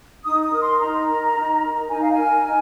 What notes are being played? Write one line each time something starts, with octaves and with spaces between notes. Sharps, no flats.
D#4 D#6
D#6
A#4
C6
D#4 A#5
A#4
D#4
A#4
D#4 G#5
F5
G#5
A#4
D#4